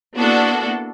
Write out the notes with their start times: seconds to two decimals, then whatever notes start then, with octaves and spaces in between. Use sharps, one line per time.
0.17 A#3 B3 D4 E4 F#4 A4